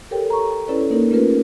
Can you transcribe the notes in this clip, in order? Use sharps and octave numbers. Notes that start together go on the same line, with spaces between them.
G4 A4 A#4 C#5 G5
A#5 C#6
C#4 E4 A4 B4 C#5 D5
A#3 D#4 A#4
A3 C#4 F4 G#4 A#4 B4